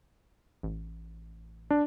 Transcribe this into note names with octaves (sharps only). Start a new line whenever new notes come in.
A1
D4